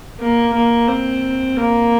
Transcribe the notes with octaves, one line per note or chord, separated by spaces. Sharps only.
A#3
A#3
C4
A#3